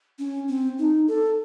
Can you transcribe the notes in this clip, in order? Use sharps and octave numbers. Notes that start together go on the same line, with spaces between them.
C#4
C4
D#4
A4